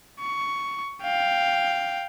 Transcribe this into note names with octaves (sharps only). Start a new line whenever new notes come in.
C#6
F5 G5